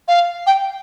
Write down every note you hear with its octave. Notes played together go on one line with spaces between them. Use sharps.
F5
G5